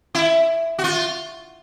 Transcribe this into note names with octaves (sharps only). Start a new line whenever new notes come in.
E4
F#4
F4